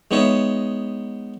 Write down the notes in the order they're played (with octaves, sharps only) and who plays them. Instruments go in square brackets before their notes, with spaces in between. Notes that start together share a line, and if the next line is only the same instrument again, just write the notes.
[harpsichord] G#3 B3 D#4 C#5 E5